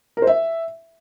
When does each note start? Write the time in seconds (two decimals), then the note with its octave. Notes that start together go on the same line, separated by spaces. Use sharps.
0.17 A#4
0.22 C5
0.27 E5